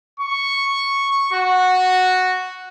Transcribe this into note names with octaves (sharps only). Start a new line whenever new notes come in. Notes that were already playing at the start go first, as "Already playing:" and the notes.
C#6
F#4